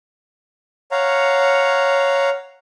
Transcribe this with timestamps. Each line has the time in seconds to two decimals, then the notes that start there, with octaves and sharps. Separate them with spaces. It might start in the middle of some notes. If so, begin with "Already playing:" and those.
0.91 C#5 F5 F#5 A#5